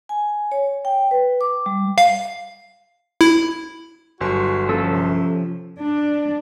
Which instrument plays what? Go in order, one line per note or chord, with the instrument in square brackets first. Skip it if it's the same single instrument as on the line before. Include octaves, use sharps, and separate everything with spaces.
[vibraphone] G#5
C#5
G5
B4
D6
G3
[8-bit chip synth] F5
E4
[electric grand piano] G1 F#3 C6 [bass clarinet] F#4
[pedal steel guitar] F3 C#4 E6 [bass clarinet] A#3 [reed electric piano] A4
[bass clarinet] C3
[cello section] D4